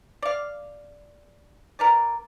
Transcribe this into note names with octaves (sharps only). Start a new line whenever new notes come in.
D5 F5
A#4 B4 D5